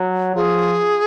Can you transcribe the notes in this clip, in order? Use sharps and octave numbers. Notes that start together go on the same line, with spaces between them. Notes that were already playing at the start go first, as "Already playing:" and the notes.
Already playing: F#3
F3 G#4